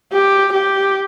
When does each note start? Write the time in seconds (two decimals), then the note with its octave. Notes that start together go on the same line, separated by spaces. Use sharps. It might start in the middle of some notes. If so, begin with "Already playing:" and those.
0.13 G4
0.53 G4